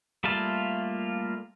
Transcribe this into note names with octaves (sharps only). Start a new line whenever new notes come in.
G3 A3 A#3 F4 A5